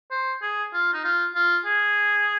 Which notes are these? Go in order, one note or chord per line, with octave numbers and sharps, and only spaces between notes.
C5
G#4
F4
D#4
F4
F4
G#4